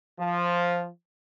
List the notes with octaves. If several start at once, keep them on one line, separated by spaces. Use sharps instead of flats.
F3